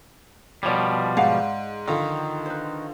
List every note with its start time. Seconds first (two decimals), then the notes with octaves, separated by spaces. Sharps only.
0.63 B2 F3 G3 C#5 D5
1.17 G#2 D5 F5 F#5
1.88 D3 D#3 F3 F4
2.46 B4 C5